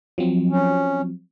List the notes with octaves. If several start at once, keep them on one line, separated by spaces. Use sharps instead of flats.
F3 F#3 C4
C#4